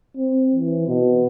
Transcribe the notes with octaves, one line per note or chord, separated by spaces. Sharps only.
C4
E3
B2